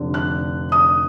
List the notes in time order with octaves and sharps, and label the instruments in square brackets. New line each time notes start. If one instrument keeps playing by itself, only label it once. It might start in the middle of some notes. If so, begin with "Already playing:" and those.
Already playing: [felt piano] F1 D3
F#6
D#6